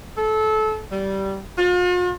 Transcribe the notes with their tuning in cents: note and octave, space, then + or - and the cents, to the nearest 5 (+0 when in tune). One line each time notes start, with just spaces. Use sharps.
A4 -25
G3 -15
F4 +45